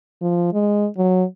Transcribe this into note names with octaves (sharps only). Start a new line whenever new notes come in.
F3
G#3
F#3